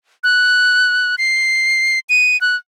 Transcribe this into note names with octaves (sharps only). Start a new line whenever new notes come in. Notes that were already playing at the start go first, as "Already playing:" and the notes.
F#6
C7
D#7
F#6